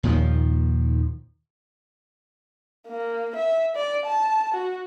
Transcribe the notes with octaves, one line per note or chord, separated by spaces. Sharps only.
D#2 A#2 D#3 F3
A#3
E5
D5
A5
F#4